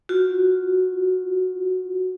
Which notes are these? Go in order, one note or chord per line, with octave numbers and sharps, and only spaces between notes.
F4 F#4